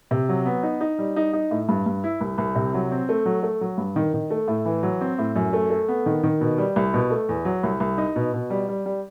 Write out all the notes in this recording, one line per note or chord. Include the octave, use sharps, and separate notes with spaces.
C3
F#3
B3
D#4
D#4
G3
D#4
D#4
A2
G2
G2
E4
C2
C2
C3
F#3
C4
A3
F#3
A3
F#3
G2
D#3
D#3
A3
A2
E3
F#3
C4
A2
F#2
A3
A3
B3
D#3
D#3
B2
G3
C2
B2
A3
E2
F#3
C2
C2
D#4
B2
B2
G3
G3
G3